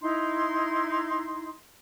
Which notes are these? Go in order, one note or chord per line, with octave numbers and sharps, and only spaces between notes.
D#4 E4 C6